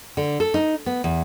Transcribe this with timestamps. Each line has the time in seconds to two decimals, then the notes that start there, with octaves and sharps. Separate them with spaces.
0.17 D3
0.40 A4
0.54 D#4
0.86 B3
1.04 E2